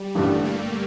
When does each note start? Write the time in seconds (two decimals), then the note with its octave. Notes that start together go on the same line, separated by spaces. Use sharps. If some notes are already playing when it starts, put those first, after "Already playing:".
Already playing: G3
0.15 A1 G2 D3 A3
0.45 A#3